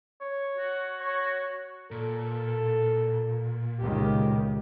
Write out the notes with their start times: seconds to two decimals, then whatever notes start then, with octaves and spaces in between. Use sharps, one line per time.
0.21 C#5
0.57 F#4
1.00 C#5
1.91 A#2 A4
3.80 C#2 D#3 G4